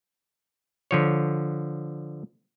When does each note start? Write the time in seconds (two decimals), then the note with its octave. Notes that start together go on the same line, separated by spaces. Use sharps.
0.91 D3 F3 C#5